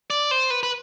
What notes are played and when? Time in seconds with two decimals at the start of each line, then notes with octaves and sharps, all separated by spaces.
0.10 D5
0.31 C5
0.50 B4
0.63 B4